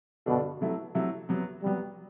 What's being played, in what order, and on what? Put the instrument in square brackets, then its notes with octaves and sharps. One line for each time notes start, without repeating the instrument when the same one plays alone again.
[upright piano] G2 D3 G3 D4 A4 [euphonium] B2
[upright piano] C3 F#3 A3 E4 A4
C3 F#3 A3 E4 A4
E2 C3 F#3 B3
[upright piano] E2 C3 F#3 B3 [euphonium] G3